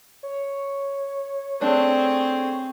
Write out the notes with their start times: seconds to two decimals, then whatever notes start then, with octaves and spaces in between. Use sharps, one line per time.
0.23 C#5
1.61 A3 C4 D4 G#4